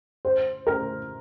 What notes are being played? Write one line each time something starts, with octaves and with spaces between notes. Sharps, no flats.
C5
A#4